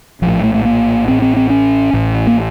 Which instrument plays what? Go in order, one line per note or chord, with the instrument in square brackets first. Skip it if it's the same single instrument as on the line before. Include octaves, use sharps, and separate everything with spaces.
[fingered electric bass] A#1 A2 F3
A3
A3
A#3
A1 A2 C4
C4
C4
C#4
A1 A2
A#3